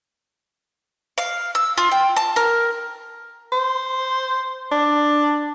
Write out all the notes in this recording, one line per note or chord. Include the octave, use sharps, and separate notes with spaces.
F5
E6
F4
G5
A5
A#4
C5
D4